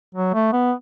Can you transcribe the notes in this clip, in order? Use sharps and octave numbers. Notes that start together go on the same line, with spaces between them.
F#3
A3
B3